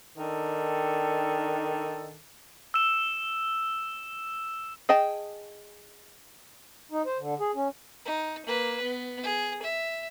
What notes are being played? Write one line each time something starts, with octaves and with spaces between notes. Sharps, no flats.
D#3 D4 A4
E6 E7
G#4 D#5 G5 A5
D#4
C5
D3
G#4
C#4
D#4
A#3 B4
B3
G#4
E5